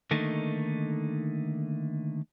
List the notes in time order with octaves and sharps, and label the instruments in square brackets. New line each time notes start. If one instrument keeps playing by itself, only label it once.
[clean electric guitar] D3 D#3 A3 A#3 D#4